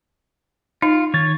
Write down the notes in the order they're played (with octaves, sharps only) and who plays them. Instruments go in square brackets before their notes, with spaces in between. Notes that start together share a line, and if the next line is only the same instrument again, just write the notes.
[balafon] D#4 [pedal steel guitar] F4
[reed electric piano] D#3 A6 [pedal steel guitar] C#5